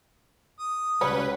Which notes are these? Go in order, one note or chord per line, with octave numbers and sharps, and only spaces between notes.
D#6
C#2 C#3 G3 F#4 B4 C#5